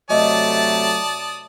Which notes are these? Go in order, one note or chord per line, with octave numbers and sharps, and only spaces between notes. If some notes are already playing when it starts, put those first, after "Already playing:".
C3 F#3 A3 D5 D#5 A5 D#6